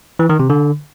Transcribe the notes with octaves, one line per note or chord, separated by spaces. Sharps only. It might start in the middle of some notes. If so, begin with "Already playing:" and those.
E3
D#3
C3
D3